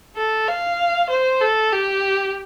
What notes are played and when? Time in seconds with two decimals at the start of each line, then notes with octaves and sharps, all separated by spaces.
0.17 A4
0.48 F5
1.11 C5
1.42 A4
1.73 G4